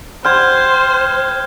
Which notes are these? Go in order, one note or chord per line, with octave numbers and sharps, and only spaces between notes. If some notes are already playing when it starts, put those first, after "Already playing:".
C5 G5 C6 F6 G6 G#6